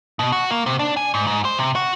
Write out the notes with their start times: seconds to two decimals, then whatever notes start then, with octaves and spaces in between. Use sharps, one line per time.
0.19 B2
0.32 F#4
0.51 A#3
0.66 C3
0.79 D4
0.97 G#5
1.14 G#2
1.27 G#2
1.45 C5
1.58 C3
1.75 F#4